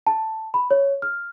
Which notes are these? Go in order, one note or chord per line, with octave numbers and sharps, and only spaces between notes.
A5
B5
C#5
F6